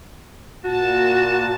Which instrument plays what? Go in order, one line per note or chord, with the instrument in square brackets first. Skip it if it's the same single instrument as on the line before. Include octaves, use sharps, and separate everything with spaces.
[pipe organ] A#2 A5 [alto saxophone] F#4